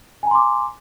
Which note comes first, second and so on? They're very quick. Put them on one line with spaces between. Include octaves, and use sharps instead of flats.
G#5 A#5 C6 D6